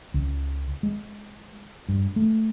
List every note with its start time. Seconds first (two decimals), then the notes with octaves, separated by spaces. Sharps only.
0.14 C#2
0.83 G#3
1.89 G2
2.16 A3